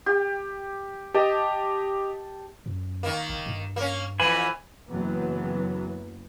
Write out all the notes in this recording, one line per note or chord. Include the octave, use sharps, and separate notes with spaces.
G4
G4 D#5 A5
F#2
D#3 A#3
F#1
G2
A#3 C#4
F2 E3 G#5 B5
F#1 E3 F#3 B3